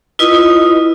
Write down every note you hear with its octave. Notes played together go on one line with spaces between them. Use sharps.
E4 F4 B4 D#5 D#6